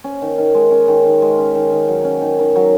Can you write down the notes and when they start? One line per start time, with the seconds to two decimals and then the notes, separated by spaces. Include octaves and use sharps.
0.04 C#4
0.22 D#3
0.38 D#3
0.54 G#3
0.71 C#4
0.88 D#3
1.05 D#3
1.22 G#3
1.38 C#4
1.55 D#3
1.71 D#3
1.88 F#3
2.05 C#4
2.22 D#3
2.39 D#3
2.56 F#3